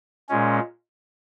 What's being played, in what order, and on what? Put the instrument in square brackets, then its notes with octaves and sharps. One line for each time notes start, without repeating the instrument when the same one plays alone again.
[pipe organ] A#2 G#3 C#4